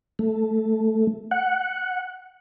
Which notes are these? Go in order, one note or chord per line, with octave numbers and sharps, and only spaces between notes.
A3
F#5